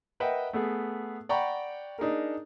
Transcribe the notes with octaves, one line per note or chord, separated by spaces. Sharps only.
A#4 B4 D#5 E5 F#5 G5
A3 B3 G#4
D5 F#5 G5 A#5 B5 C#6
D4 D#4 G#4 A#4